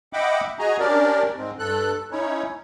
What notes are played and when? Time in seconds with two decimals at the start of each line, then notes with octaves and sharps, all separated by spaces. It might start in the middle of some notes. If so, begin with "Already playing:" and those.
0.13 D#5 E5 F#5 G5 B5 D6
0.59 F#4 G#4 D#5 G#5 A#5
0.79 C#4 D4 G4 A#4 D5
1.36 G#2 G#3 C4
1.59 G2 A4 F#6
2.12 C#4 D#4 E4 C#5